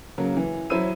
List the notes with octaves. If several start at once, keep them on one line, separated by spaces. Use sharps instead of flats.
C#3 F#3 A#3
E3
F#3 E4 C5 B5 E6 D#7